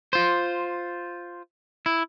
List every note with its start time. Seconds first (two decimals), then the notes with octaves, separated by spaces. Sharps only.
0.13 F4 C5
1.86 E4